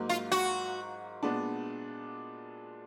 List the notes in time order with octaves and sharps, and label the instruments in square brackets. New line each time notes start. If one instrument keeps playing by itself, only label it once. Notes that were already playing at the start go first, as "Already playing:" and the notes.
Already playing: [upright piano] G#2 F#3 A#3
[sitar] F4
F#4
[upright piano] A#2 G#3 B3 D4